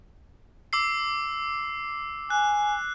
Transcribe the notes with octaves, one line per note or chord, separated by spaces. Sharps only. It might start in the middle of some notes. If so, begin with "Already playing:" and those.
D6 E6 C7
G#5 F#6